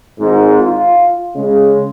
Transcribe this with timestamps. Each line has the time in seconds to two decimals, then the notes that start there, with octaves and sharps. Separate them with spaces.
0.19 G#1 G#2
0.60 F4
1.36 C#3 G#3